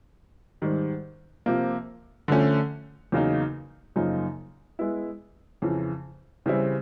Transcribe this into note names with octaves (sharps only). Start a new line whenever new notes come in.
G#2 D#3 G3
C3 F3 A#3
D3 F3 A3 C#4
E2 C#3 F#3 A#3 D#4
F#2 C#3 F3 A#3 D#4
G#3 B3 E4
F2 C#3 E3
C#3 E3 G3 C4 E4